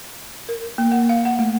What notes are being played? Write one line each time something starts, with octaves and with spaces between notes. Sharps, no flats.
A#4
A#3
F#5
F5
F#5
A3